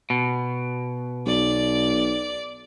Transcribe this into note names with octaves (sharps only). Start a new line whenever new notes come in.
B2
B1 D5